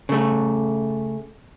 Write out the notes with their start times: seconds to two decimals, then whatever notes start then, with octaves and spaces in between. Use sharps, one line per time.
0.09 C#3 A3